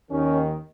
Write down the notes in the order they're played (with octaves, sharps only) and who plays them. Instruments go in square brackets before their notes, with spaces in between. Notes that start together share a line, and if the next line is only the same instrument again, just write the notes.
[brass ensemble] D#2 D#3 [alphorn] C#4